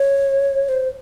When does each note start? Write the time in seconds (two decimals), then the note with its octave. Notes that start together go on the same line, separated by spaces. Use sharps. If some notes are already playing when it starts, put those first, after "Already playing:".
Already playing: C#5
0.69 C5